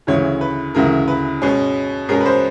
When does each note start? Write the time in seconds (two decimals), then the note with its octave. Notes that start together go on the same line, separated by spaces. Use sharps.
0.07 D2 C#3 E3 G#3 C#5
0.41 B4
0.75 D2 C#3 E3 G#3 A#4
1.08 B4
1.42 B2 G#3 C#4
2.09 B2 G#3 C#4 A#4
2.21 B4
2.26 C5